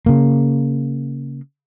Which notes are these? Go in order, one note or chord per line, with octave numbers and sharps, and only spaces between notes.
C#3 A#3